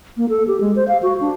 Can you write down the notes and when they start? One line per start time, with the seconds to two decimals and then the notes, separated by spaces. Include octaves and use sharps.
0.17 A#3
0.29 A4
0.48 G4
0.61 G#3
0.76 C5
0.88 F5
1.03 F#4
1.21 D4